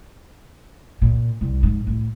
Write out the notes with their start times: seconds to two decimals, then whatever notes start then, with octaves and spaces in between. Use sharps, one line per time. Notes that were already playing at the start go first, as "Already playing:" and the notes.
1.01 A#2
1.41 C2
1.63 G#2
1.87 A2